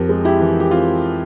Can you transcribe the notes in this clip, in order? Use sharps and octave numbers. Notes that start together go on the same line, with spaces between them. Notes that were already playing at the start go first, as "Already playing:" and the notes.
Already playing: F2 G4 A#4
G#3
E4 G4
E3
G4
C4 F4